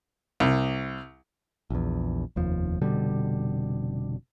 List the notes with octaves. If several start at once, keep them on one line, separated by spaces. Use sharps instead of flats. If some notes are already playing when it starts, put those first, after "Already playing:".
C2
A#1 E2
F1 D#2 F3
F1 B2 D3 G3